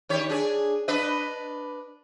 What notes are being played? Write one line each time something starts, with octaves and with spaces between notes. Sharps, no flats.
D#3 G4 C#5
D4 G#4
D4 B4 D#5